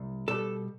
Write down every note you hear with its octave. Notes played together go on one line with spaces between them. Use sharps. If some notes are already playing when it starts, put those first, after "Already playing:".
Already playing: C2
B2 G3 A4